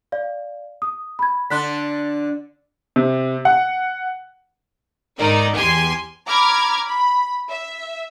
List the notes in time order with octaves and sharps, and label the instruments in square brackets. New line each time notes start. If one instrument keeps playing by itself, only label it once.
[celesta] D5 F5
D#6
B5 G#6
[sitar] D3 D4 [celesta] C6 F#6 B6
[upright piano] C3
F#5
[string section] G#2 D#3 D#4 D5
E2 G4 G#5 C6
[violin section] A#5 B5 D6 F6 G#6
B5
E5